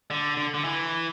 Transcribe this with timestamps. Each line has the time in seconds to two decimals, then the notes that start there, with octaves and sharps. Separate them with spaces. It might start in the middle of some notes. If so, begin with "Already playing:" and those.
0.10 D3
0.37 D3
0.54 D3
0.64 E3